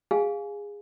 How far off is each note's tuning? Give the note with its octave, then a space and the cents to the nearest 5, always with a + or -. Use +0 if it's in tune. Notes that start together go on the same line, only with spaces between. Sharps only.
G#4 -20 F5 +5 G#5 +15